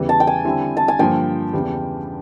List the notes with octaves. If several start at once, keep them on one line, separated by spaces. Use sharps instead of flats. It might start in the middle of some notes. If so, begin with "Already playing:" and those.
Already playing: E2 C#3 E3 G3
A5
G5
G#5
D3 G3 C4 E4
A5
G#5
G2 D3 F3 A#3 G5
E2 C#3 E3 G3